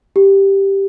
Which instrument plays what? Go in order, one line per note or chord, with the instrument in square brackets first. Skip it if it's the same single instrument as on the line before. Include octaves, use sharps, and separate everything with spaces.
[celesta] G4